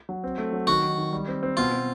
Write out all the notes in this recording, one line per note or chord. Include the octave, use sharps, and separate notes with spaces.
F#3
C4
A3
F#3
D#3 F#4
D#3
D#3
G3
C4
C4
B2 F4
B2